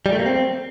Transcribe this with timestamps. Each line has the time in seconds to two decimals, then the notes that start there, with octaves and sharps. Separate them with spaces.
0.06 G3
0.12 A3
0.19 A#3
0.26 C4